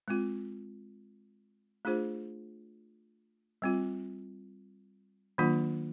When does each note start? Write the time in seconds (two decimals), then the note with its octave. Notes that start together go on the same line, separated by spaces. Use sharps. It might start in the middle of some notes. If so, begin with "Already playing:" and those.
0.08 G#3 C4 F4
1.85 A3 D4 F4 G#4 C5
3.62 G3 C4 F4
5.38 D#3 F#3 A#3 D4 F4